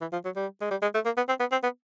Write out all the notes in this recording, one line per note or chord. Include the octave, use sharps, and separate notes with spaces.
E3
F3
F#3
G3
G#3
G3
G#3
A3
A#3
B3
C4
B3
C4
B3